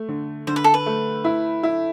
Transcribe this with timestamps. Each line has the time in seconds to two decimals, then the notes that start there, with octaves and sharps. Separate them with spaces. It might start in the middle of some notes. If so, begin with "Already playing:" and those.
Already playing: A3
0.09 D3
0.47 D3 C5
0.56 B4
0.64 A4
0.74 B4
0.86 A3
1.24 E4
1.63 E4